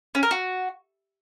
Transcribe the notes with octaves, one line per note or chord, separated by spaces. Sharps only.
C#4
A#4
F#4